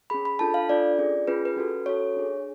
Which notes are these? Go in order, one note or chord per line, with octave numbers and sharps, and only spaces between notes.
C#4 G#4 B5
B5
D4 F4 A4 A5
F5
D4 F4 A4 D5
C#4 F4 G#4
C#4 F4 G#4 B4
B4
C#4 F#4 A4
C#4 F#4 A4 C#5
D4 G#4